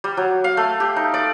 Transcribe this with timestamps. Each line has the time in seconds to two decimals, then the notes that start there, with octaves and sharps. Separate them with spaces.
0.04 G3
0.17 F#3
0.44 F5
0.57 A3
0.80 G4
0.96 D#4
1.14 D5